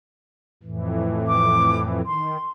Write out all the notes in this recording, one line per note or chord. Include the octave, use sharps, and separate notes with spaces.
F2 A2 E3
D6
D#3 C6